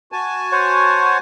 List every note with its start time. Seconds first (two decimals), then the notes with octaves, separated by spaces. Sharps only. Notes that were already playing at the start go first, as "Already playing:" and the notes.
0.12 F#4 G#5 A5
0.52 C5 C#5 F#5